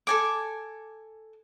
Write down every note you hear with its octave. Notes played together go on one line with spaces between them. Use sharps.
A4 G#5 D6